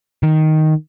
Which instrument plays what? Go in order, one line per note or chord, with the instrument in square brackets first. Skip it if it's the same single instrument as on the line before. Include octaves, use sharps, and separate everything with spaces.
[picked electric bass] D#3